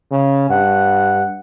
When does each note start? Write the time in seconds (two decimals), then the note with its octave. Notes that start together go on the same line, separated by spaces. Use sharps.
0.11 C#3
0.49 G2 F#5